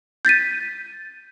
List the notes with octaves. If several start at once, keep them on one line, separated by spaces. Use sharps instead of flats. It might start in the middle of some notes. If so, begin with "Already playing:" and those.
G6 A6 B6 D#7